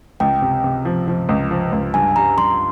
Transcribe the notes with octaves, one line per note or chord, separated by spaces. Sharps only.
C#2 G5
C3
C3
F3
F3
C#2
F3
C#2
G2 G#5
G3 A#5
G2 C6